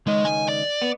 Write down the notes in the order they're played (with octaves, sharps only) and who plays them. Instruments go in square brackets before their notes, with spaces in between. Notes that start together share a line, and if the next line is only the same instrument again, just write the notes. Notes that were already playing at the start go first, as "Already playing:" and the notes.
[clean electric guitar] C#2 D#3 D#5 [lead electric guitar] G#3
[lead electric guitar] G#5
D5
[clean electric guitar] B3